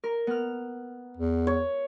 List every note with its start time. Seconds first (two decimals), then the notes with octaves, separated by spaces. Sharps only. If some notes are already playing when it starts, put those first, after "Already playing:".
0.04 A#4
0.27 B3 F6
1.17 E2
1.47 C#5